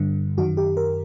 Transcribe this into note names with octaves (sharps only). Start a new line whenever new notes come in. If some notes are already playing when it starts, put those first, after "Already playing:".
Already playing: G2 D3
F#2 D#3 F#4
G4
A#4